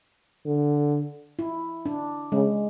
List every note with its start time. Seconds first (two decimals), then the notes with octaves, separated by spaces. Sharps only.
0.46 D3
1.39 E4
1.86 D4
2.32 C#3 G#3